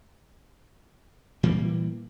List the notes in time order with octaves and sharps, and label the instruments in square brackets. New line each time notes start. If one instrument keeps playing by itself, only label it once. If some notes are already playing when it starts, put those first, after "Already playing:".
[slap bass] A#2 E3 G3 A#3